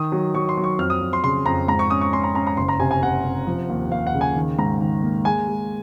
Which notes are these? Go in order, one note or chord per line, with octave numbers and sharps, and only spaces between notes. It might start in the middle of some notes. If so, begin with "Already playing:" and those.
Already playing: D#3 D#6
F#3
F#3 C#6
C6
F#3
C#6
F2 F6
D#6
F2
C6
C#3 C6
F2 A#5
G#2 A#5
C#6
C#4 D#6
C#6
C#4 C6
A#5
C#4 A#5
A#5
F#1 C6
A#5
C3 G#5
G#5
F#1 F#5
C3
F3
D#2
D#2 F5
F#5
C#3
G#5
D#3
G#2 A#5
D#3
A#3
G#3 G#5
G#3